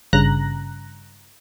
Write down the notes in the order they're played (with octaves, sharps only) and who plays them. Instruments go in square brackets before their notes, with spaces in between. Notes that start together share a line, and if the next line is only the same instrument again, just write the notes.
[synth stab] G#1 G2 C#3 A#5 F#6 A#6